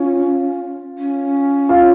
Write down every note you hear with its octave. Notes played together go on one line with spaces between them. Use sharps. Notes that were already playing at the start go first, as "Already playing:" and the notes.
Already playing: C#4 F4
C#4
F4